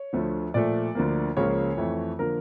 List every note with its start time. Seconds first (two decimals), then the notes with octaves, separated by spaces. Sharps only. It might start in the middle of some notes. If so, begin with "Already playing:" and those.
Already playing: C#5
0.13 D2 D3 F3 A3
0.54 A#2 F3 A3 D5
0.95 D2 D3 F3 A#3
1.37 C#2 C#3 F3 A#3 C#5
1.77 F2 E3 A3
2.19 D3 F3 A#3 A#4